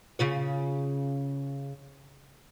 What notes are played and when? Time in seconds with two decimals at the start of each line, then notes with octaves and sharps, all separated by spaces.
0.19 C#3 F4 C#5